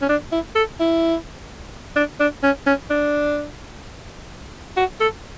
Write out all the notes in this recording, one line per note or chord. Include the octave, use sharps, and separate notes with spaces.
C#4
D4
E4
A4
E4
D4
D4
C#4
C#4
D4
F#4
A4